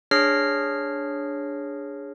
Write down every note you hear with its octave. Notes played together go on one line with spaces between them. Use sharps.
D4 G#4 C#5 F6 A#6 C7